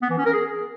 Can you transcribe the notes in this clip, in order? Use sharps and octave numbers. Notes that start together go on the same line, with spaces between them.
B3
E3
C#4
A#4
G#4